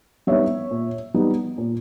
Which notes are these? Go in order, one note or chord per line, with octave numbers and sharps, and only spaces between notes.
G3 B3 D#4 C#5 E5
A#2
G3 B3 D#4
A#2